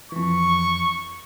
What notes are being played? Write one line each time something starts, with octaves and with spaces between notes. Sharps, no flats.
F2 E3 C#6